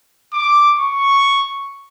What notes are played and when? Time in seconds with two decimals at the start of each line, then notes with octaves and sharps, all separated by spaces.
0.33 D6
0.80 C#6